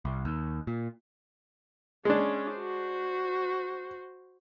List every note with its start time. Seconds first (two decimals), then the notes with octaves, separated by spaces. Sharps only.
0.05 C2
0.25 D#2
0.67 A#2
2.05 G#3 C#4 D4
2.55 F#4 C5